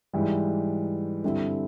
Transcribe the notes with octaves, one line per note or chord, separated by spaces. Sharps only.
G#2 E3 G3
G2 D3 G3 C4 E4